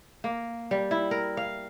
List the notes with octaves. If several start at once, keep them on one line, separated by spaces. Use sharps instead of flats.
A#3
G3
E4
A#4
F5